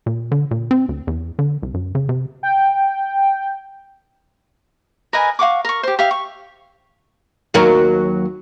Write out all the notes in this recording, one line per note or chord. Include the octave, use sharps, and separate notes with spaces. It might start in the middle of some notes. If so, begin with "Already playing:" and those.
A#2
D3
A#2
C4
D2
E2
D3
C2
F#2
C#3
C3
G5
A#4 B4 D#5 G#5
F5 F#5 C#6 D6
A#4 C#6
G4 C5
G4 E5 F5
C#6
D#2 F#3 A#4